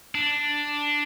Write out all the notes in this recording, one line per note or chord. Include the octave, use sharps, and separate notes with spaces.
D4